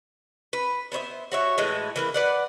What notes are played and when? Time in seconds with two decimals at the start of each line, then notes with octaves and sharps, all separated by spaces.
0.53 B4
0.92 B3 C5 C#5 E5
1.32 F#4 C#5 E5
1.58 A2 E3 G#3
1.96 E3 A#3 B4
2.14 B4 D5 F#5